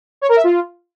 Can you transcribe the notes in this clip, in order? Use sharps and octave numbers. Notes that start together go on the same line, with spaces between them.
C#5
A#4
E5
F4